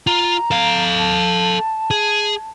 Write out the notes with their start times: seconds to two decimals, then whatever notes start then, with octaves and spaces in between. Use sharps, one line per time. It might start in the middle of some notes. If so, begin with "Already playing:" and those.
0.07 F4 A#5
0.51 A4 F5
0.99 A5
1.91 G#4